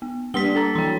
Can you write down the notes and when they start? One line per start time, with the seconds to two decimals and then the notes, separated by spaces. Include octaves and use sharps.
0.02 B3
0.34 G3 A#3 D4 G4 C6 B6 G7
0.55 A#3 A4 A#5
0.75 E3 F#3 G5 C6